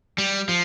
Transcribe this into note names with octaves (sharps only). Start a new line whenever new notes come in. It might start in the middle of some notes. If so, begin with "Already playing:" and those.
G3
F3